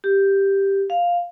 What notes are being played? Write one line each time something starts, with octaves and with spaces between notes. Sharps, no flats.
G4
F5